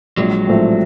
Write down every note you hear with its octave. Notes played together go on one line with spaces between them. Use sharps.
A#1 F#3 G#3
A2 F3 A3 C4